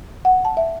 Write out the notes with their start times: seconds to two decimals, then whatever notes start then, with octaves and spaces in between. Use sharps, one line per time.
0.25 F#5
0.45 A5
0.57 E5